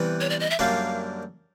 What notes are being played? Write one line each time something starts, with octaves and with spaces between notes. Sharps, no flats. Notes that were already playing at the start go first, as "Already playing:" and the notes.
Already playing: C3 E3 G3 B3
C#5
D5
D#5
E5
F#2 D3 G3 A#3 F5